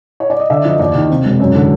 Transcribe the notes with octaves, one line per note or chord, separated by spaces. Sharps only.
C#5
D5
D#5
D3 D5 E5
F3 D#5
D#2 D5
D#3
C3
E1
F#2
D3